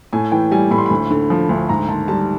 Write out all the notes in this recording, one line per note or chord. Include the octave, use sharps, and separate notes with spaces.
A2 G#5
E3 G5
G3 G#5
A2 B5
C6
D2 B5
D3
F3
D2
G#2 A#5
D#3 A5
G3 A5